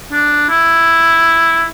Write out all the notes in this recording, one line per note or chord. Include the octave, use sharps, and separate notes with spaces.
D4
E4